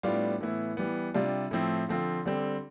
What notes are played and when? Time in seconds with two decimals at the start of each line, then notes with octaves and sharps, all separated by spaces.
0.03 A2 G3 B3 D4 F4
0.41 A2 E3 B3 E4
0.77 E3 G3 B3
1.14 C3 G3 D4 F4
1.51 A2 F3 C4 E4
1.89 D3 F3 C4 F4
2.25 D3 G3 C4